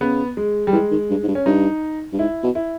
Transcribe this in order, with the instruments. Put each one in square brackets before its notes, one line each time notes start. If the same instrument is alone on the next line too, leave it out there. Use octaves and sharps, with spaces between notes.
[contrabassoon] C#3 [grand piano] B3
[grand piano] G#3
G3
[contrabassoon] E3 [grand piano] G#3
[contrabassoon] D#3
G2
G#2
G2
[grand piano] C#4
[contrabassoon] G2 [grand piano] D#4
[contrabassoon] G2
[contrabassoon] G#2 [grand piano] E4
[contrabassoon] B2
[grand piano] E4